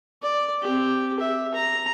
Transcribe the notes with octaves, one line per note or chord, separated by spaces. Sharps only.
D5
C4 G4
E5
A#5